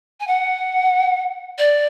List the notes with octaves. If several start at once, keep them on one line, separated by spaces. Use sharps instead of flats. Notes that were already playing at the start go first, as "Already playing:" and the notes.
G#5
F#5
D5